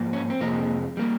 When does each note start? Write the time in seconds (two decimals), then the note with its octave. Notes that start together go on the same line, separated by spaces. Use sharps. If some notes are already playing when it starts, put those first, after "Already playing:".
Already playing: G#2 F3 A#3
0.13 C#4
0.30 C4
0.41 F2 C3 F3 G#3 A#3
0.97 G3 A#3